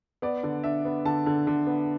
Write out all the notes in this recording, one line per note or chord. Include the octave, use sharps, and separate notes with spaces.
B3 D5
D3
D4 E5
B3
D3 A5
D3
D3
B3